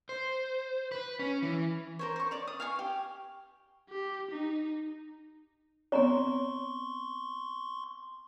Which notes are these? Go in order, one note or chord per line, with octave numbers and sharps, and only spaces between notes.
C5
B4
C#4
E3
A#4 C5 C#5
C5 C#6
C#5 D5 D6
D#6
F5 G#5 C#6
G4
G4
D#4
B3 C4 C#5 A#5 C6 C#6